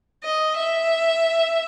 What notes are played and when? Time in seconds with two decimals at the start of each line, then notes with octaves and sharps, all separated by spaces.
0.24 D#5
0.56 E5